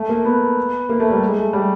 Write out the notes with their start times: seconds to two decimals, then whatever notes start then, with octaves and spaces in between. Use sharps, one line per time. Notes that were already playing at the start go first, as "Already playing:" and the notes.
Already playing: A3
0.09 A#3
0.25 B3
0.89 A#3
1.00 A3
1.10 G3
1.28 G#3
1.38 A3
1.53 G3